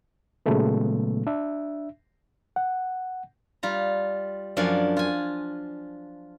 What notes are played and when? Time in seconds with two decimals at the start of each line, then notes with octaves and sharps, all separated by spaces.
0.46 A#2 C#3 F#3 G#3 A3 B3
1.27 D4 E5
2.56 F#5
3.63 G3 F4 A#5
4.57 F#2 F3 D4 D5 F5 G#5
4.97 F4 G#5